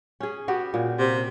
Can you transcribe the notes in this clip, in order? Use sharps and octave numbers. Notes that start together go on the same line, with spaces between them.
C#4 G#4
B3 F#4 G4
A#2
C3